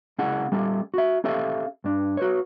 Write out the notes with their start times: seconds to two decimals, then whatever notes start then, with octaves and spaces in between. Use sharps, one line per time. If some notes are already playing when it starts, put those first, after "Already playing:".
0.18 C#2 C#4 E4 G#4 F#5
0.52 G3 C#4 G4 A4
0.94 F#4 E5
1.24 C#4 G4 A4 E5 F5
1.84 G2 D4
2.17 F#4 B4 C#5